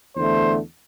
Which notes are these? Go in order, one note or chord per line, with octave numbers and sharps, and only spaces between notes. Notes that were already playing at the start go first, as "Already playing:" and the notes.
E2 D3 A3 C5